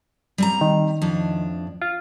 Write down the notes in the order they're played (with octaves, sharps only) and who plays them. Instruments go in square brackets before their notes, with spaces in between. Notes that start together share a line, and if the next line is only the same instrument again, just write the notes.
[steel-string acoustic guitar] G3 C4 A#5
[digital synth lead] D#3
[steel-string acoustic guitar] F2 A2 D4
[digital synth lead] F4